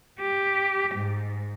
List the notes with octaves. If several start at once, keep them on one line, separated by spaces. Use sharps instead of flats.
G4
G#2